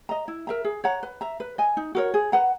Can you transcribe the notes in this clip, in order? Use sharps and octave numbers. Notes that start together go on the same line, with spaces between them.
D#5 A#5
E4
A#4 E5 A#5
G#4
C#5 F#5 A#5
B4
E5 A#5
B4
D#5 G#5
D#4
F#4 A#4 C#5
G#4
B4 F#5 A#5